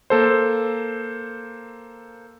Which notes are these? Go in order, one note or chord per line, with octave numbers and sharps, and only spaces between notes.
A#3 A4 C5